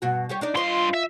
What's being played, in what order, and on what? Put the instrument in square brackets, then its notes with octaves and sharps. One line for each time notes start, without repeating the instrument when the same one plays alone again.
[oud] G2 B2 F#4
G3 G4 C#5
D4 D#4 D5
[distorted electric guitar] G2 C6 [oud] F4 C#5 D#5
[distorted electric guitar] E5